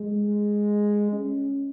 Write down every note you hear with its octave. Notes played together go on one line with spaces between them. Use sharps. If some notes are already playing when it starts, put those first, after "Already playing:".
Already playing: G#3
C#4